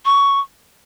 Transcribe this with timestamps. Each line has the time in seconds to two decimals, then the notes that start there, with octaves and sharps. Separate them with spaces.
0.05 C#6